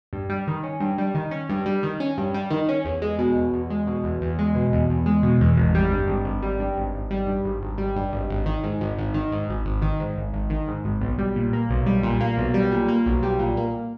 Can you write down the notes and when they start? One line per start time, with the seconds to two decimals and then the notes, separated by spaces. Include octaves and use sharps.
0.13 G2
0.29 G3
0.47 D#3
0.63 C#4
0.80 G2
0.98 G3
1.14 D#3
1.31 C#4
1.49 G2
1.66 G3
1.83 D#3
2.00 C#4
2.18 G2
2.34 G3
2.50 D#3
2.69 C#4
2.85 E2
3.02 G#3
3.19 B2
3.36 E2
3.53 E2
3.70 G#3
3.87 B2
4.04 E2
4.22 E2
4.39 G#3
4.55 B2
4.73 E2
4.90 E2
5.06 G#3
5.23 B2
5.41 E2
5.57 G#1
5.75 G3
5.92 G2
6.08 G#1
6.25 G#1
6.42 G3
6.59 G2
6.76 G#1
6.94 G#1
7.10 G3
7.27 G2
7.44 G#1
7.62 G#1
7.78 G3
7.96 G2
8.13 G#1
8.29 G#1
8.46 D#3
8.64 G#2
8.81 G#1
8.98 G#1
9.14 D#3
9.32 G#2
9.49 G#1
9.66 G#1
9.82 D#3
10.00 G#2
10.17 G#1
10.33 G#1
10.50 D#3
10.68 G#2
10.85 G#1
11.01 B1
11.18 G3
11.36 A#2
11.53 A#3
11.69 B1
11.86 G3
12.03 A#2
12.20 A#3
12.37 B1
12.54 G3
12.72 A#2
12.88 A#3
13.06 B1
13.23 G3
13.39 A#2
13.57 A#3